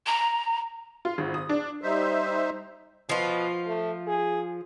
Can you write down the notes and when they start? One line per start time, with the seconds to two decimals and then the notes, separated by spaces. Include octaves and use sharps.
0.07 A#5
1.05 F4
1.18 G#1
1.34 D#6
1.49 D4
1.81 G3 D#4 C5 E5
3.09 B2 F3 F4
3.66 A3
4.07 G#4